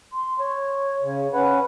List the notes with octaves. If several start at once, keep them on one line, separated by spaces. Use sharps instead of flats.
C6
C#5
C#3
C#4 B4 F#5 B5